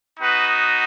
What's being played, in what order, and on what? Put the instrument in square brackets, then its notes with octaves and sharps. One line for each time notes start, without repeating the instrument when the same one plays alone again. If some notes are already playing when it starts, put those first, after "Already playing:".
[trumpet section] B3 D#4 F#4 B4